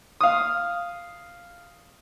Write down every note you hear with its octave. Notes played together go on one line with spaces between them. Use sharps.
F5 D#6